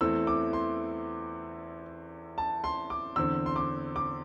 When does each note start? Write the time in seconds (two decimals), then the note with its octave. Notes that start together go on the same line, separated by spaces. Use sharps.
0.01 E2 E3 A3 C4 E6
0.27 D6
0.53 C6
2.38 A5
2.64 C6
2.90 D6
3.16 E2 D3 C4 E6
3.46 C6
3.56 D6
3.96 D6